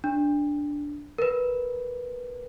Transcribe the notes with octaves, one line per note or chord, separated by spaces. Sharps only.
D4
A#4 B4